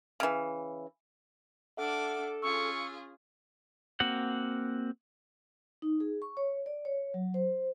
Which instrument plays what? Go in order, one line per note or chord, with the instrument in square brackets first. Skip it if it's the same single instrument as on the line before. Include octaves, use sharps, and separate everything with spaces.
[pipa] C#3 E3
[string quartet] D4 D6 [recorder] A4 [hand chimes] E5 F#5 F6
[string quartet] C#4 F4 G#4 [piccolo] C#6 [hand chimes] E6
[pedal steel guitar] A#3 C4 F#4 F#5
[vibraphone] D#4
G#4
C#6
C#5
D5
C#5
F#3
C5